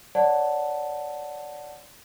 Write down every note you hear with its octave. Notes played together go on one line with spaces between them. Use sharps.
C#5 D5 F#5 A5